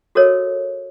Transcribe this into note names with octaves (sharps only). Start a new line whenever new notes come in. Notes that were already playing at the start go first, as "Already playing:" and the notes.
F#4 A4 A#4 C#5 D#5